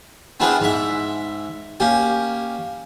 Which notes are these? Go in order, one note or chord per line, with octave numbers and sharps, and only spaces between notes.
B3 C4 D4 E4 G#4 A#4
G#2 E5
A#3 C#4 G4